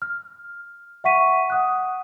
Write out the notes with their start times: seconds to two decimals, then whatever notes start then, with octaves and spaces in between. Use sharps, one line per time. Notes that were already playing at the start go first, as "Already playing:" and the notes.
0.02 F6
1.04 E5 F#5 C#6 B6 D#7
1.50 F#5 D#6 F#6